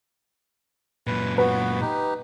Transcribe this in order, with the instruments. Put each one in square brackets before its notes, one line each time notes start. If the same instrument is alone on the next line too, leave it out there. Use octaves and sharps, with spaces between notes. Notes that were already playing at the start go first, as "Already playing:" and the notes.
[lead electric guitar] F#2 A#2 [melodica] B4
[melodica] B3 F#4 [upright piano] B4
[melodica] D#4 G4